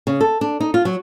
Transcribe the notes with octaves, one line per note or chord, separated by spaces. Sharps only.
C#3
A4
D4
D#4
F4
F#3